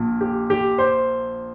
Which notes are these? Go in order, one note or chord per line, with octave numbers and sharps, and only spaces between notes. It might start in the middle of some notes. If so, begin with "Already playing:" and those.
Already playing: A#1 A#2
G4
G4
C5